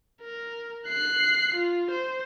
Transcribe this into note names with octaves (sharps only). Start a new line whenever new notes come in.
A#4
F#6 C7
F4
C5